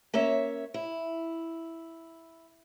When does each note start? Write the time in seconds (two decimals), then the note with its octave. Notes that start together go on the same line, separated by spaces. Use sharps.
0.14 A#3 C#4 C#5 E5
0.74 E4